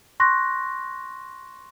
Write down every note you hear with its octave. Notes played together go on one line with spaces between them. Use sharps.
C6 C#6 F#6 A#6